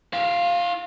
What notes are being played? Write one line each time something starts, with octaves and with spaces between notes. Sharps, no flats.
E4 F5